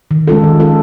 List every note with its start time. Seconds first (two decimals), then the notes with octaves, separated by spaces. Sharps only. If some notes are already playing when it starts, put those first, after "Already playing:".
0.11 D#3
0.27 G#3 C#4 F4 A4
0.44 D#3
0.60 G#3 C#4 F4 A4